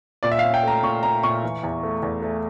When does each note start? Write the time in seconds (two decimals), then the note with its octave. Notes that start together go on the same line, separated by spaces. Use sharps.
0.23 A#2 D5
0.32 E5
0.39 F5
0.44 C#4
0.54 G5
0.63 A3 A#5
0.83 A#2 C#6
1.03 A#2 A#5
1.23 A#2 C#6
1.43 E3
1.63 E2
1.83 A3
2.03 E2
2.22 A3